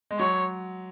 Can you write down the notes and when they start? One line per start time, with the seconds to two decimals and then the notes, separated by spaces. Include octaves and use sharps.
0.11 G#3
0.19 F#3 C#5